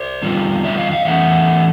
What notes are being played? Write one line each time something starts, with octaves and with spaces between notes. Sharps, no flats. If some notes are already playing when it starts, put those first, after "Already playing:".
Already playing: C5 D5
D3 G3 C4 F4
D5 E5
D#5 F5
D#5 F5
E3 A3 C#4 E5 F#5